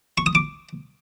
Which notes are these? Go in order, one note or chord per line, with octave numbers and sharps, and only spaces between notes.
C#6
D#6
D6